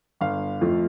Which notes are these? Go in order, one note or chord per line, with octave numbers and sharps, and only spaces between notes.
G1 F5
F2 F3 A3